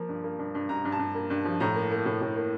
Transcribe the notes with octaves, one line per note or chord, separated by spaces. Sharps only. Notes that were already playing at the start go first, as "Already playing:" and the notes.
Already playing: F3 A#3
G2
A#3
G2
G2
G2 A#5
G2
A5
G2
A#3
G2
F3
A2 A#5
A#3
A#3
A2
A2
A#3